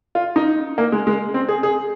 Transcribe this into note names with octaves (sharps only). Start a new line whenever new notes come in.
F4
D#4
A#3
G#3
G#3
C4
G#4
G#4